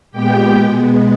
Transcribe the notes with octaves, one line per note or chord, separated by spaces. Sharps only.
A#2 G#3 B3 G4 G5
B2 G#3 B3